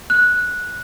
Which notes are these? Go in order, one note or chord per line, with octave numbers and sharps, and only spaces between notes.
F#6